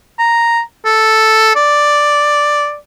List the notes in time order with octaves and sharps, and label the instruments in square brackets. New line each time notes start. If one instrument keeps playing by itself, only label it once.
[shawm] A#5
A4
D5